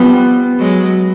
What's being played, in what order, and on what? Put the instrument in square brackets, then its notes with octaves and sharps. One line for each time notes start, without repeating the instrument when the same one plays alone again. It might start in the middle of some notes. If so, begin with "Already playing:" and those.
Already playing: [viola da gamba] F3 G3 [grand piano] B3
[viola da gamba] F#3 G#3